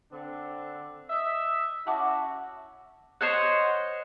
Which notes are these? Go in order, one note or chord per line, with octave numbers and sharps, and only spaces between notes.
D3 C4 D4
D#5 E5
C#4 E4 F#4 F#5 A5 D6
C5 C#5 D#5 F#5